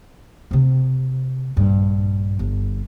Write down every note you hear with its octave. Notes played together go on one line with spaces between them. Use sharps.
C3 C4
A#1 G2
G1